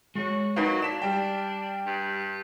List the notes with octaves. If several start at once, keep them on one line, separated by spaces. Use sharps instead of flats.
G#3 F#4 C#5
F#3 D#4 F#4 A#4 B4 F5 C7
D4 D5 B6 E7
G3 G5
G2